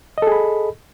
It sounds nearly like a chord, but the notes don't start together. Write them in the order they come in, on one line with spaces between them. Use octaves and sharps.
D#5 A4 G#4 B5